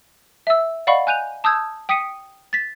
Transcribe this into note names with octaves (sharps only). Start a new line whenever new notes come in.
E5 E6
D5 D#5 F5 F#5 B5 C#6
G#5 F#6 G6 D#7 F7
A5 D#6 E6 G6 G#6
G5 D#6 B6 C#7 D#7
A6 B6